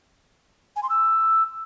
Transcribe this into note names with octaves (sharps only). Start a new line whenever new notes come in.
G#5
C6
E6